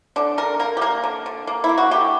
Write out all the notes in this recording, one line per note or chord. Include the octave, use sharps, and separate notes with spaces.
D3 D4
D3 A#4
A#3 A#4
G4
A#3 A#4
D3
D3
A#3
E4
A#3
F#4
D3 G4